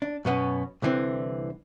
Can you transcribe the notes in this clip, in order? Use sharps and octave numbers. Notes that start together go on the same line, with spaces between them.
D4
F#2 B2 B3 C#4
C2 D3 E3 C4